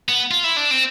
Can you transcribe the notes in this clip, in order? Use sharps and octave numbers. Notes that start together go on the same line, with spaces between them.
B3
F4
E4
D4
C4